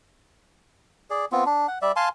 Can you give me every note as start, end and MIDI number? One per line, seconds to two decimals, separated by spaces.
1.10 1.25 68
1.10 1.25 74
1.32 1.44 59
1.32 1.44 60
1.32 1.44 65
1.46 1.67 62
1.68 1.79 78
1.82 1.92 55
1.82 1.92 74
1.82 1.92 76
1.96 2.09 77
1.96 2.09 80
1.96 2.09 81
1.96 2.09 84